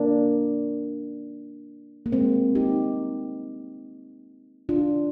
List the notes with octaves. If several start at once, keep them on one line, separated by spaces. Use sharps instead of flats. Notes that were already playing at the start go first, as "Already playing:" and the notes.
Already playing: A#3 D4
A#3
G#3 C4
D#4 G4
D4 F4